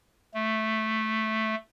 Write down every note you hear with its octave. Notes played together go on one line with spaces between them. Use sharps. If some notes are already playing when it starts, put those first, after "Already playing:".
A3